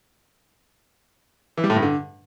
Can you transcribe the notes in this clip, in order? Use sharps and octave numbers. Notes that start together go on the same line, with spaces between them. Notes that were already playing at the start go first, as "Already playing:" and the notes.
E3
G3
A2
G2
D3